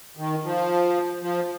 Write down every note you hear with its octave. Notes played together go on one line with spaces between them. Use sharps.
D#3
F3
F3